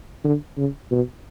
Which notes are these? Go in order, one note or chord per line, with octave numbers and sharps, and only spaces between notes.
D3
C#3
B2